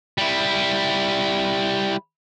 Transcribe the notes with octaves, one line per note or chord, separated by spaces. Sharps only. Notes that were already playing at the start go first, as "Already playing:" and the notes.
G3 E4